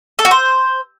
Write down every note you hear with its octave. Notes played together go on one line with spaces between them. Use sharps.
A4
F#4
C5